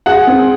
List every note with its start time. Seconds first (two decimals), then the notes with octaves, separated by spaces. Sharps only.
0.06 G#4 F#5
0.27 C4